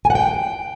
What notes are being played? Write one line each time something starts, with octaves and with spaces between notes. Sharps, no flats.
G#5
F#5
G5